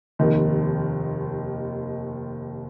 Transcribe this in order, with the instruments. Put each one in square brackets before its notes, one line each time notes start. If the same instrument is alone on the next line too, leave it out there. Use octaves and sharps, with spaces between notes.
[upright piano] F1 D#2 D#3